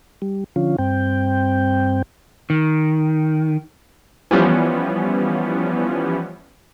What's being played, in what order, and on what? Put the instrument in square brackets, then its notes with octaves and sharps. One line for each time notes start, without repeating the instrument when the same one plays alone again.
[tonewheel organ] G3
D3 F3 C#4 F4
G2 C4 G5
[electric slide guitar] D#3
[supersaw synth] E3 F3 G3 B3 C#4